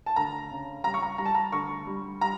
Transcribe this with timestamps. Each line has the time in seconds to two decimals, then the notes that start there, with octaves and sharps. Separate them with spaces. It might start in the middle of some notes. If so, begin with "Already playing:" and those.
0.06 A5
0.16 D2 A#5
0.51 C#3
0.84 G3 A#5
0.94 C#6
1.02 A#5
1.18 G3 A#5
1.26 A5
1.34 A#5
1.52 D2 C#6
1.87 G3
2.21 G3 A#5